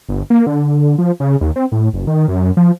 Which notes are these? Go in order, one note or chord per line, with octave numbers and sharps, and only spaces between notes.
G1
A#3
D3
F3
C#3
D#2
C4
A2
F#1
D#3
F#2
F3